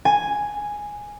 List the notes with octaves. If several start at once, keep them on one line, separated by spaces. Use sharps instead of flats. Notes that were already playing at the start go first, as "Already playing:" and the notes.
G#5